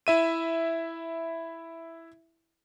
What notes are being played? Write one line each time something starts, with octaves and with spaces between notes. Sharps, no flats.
E4 E5 D#7